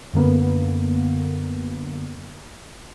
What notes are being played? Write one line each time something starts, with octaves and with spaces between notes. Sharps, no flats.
F#2 D3 A#3 B3